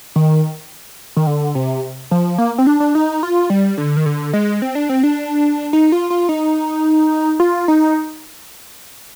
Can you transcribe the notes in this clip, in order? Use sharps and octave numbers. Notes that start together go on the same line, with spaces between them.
D#3
D#3
D3
C3
F3
A#3
C4
D4
D4
D#4
F4
G3
D3
D#3
D3
G#3
C4
D4
C4
D4
D#4
F4
F4
D#4
F4
D#4